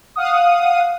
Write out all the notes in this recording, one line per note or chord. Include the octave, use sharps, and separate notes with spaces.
F5 F#5 D#6